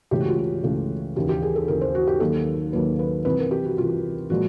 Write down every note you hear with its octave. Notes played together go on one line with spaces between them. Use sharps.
C#2 C#3 E3 A3 G4
F#4
F4
F#4
C#2 C#3 E3 A3
D#2 C#3 E3 G4
G4
G#4
A4
D#2 C#3 E3 A#4
C5
F#4
G4
D#2 D#3 F#3 A#3 A4
D#2 D#3 F#3 A#3 B4
B4
C2 C3 E3 B4
A#4
G4
F#4
C2 C3 E3 F4
A#2 F3 G#3 F#4